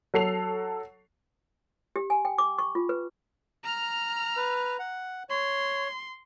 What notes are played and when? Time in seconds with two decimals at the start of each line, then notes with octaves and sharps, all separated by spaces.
0.14 F#3 A4 C7 F7
1.96 G4
2.10 G#5
2.25 G5
2.38 D6
2.59 C#6
2.75 F4
2.89 B4
3.63 A#5 F6
4.37 B4
4.79 F#5
5.30 C#5 C6